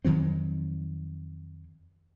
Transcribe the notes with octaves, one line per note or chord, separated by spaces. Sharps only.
F2 D#3 F#3 C4